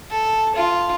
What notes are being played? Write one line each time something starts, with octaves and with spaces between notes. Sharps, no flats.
A4
F4